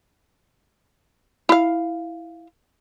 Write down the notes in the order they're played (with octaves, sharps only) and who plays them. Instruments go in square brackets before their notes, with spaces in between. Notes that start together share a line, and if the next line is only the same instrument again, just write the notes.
[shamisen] E4 F5